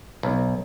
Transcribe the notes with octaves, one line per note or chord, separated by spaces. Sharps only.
B1